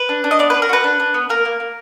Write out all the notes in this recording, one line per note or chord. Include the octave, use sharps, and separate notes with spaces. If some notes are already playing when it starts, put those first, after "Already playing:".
Already playing: B4
D4
D4
D#5
B3 D5
D4 B4
A#4
F#4 B4
D4
D4
B3
A#3 A#4
A#3
A#3